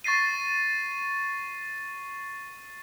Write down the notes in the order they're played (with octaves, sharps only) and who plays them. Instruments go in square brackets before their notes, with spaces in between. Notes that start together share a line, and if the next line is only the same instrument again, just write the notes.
[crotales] C#6 A6 A#6 C7 D#7